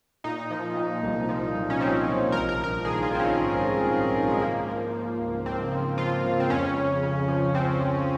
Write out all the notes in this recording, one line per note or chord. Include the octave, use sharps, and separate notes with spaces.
A#2 D#4
F3
A#2
C2
F3
C2
C#4
F3 C4
C2
A#1 A#4
A#4
A#1 A#4
D#3 G#4
F4
D#3 C4
C#4
G#2
A#1
G#2
G#2
G#3
F3 A#3
F3
F3
C#2
C#2 C4
F3
F3 F4
C#2
C4
F2 C#4
C#3
C#3
F3
F3 C4
F3